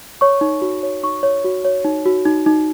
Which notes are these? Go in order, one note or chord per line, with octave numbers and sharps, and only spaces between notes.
C#5 C#6
D#4
F#4
C#5
D#4 C#6
C#5
F#4
C#5
D#4
F#4
D#4
D#4